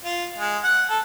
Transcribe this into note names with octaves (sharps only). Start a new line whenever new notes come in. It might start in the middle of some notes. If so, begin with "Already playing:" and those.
F4
G#3
F#5
A4